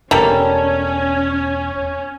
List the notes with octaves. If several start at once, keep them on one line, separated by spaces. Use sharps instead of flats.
E1 G3 A#3 C#4 A4